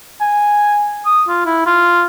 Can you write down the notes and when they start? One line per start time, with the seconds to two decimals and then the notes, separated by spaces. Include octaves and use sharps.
0.21 G#5
1.06 D#6
1.29 F4
1.46 E4
1.66 F4